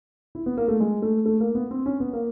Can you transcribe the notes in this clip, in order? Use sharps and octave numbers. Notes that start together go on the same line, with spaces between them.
E4
B3
A#3
A3
G#3
A3
A3
A#3
B3
C4
C#4
B3
A#3